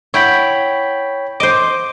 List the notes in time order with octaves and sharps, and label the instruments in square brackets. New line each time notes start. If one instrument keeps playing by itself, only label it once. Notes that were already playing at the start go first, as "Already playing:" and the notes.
[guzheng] E4 F#5 [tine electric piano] C#5 G5 B5
[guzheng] C5 D#5 [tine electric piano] D6